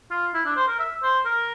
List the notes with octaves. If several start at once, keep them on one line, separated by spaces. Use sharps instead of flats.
F4
E4
D4
C5
A#4
E5
C5
A#4